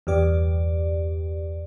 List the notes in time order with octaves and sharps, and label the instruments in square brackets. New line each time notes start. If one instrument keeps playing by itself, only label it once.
[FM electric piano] E2 G2 G4 D5